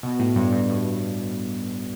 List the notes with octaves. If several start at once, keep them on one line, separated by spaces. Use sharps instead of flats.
B2
A2
G2
G2
A2